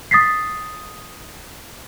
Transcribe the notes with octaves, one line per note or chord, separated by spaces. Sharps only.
D#6 A6 B6 C7